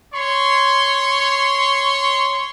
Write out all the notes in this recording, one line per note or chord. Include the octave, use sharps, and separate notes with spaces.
C#5 C6 C#6